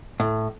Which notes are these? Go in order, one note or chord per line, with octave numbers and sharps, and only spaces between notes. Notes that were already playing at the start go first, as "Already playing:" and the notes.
A2